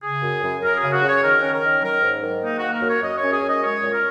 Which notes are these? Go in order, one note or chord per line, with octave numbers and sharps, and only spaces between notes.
C#3 G#4
F#2
F#2
F#2 A#4
G#4
C#3
F#4
C#3
C#5
D#3 A#4
C#4
A#4
D#3
F#3 A#4
G#2
D#3
A#3 D#4
A#3 F#4
A#4
F#2
C#5
F#2 D#5
C#5
C#4
G#4
F#2
D#5
G#3 C#5
A#2
A#4